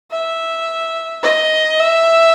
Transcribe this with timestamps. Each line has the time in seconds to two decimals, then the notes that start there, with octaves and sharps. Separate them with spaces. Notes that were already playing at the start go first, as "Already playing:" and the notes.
0.11 E5
1.23 D#5
1.79 E5